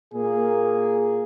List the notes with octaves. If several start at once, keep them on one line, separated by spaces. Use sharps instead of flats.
A#2 A#3 G#4